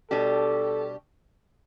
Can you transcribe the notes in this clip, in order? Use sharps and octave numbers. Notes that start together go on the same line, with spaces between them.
B2 G3 D4 G4 A4